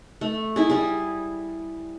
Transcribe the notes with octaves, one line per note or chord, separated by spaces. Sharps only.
A3
E4 G#4
G3 G#4